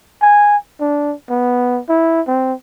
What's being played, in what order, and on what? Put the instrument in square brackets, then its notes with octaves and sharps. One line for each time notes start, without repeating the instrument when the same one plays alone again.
[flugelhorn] G#5
D4
B3
E4
C4